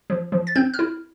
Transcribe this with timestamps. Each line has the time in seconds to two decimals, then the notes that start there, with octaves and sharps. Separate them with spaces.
0.10 F3
0.32 F3
0.47 A6
0.55 C4 G6
0.74 F6
0.79 E4